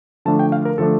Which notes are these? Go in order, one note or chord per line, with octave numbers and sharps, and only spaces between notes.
D3 F3 A3 D4 A5
G5
F5
A#4
D3 F3 A3 D4 A4